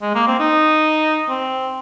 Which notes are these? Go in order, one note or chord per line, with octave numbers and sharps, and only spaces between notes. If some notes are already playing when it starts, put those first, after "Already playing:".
G#3
A#3
C4
D#4
C4